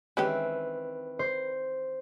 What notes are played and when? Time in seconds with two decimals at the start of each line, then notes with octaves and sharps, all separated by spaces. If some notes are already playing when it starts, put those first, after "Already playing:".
0.17 D#3 E3 G#3 C4 C#4 G4 B4
1.19 C5